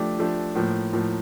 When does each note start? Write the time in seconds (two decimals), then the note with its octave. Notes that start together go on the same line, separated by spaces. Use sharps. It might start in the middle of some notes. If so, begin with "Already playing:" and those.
Already playing: F3 A3 D4 G4
0.18 F3 A3 D4 G4
0.55 A2 F3 A#3
0.93 A2 F3 A#3